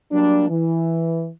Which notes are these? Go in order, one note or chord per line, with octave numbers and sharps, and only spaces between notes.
F#3 G3 A#3 D4
E3